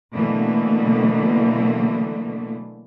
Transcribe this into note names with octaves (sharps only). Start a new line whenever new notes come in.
B2 D3 E3 F#3 A3 A#3